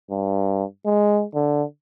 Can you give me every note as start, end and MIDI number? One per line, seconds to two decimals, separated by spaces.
0.11 0.64 43
0.86 1.24 56
1.35 1.63 50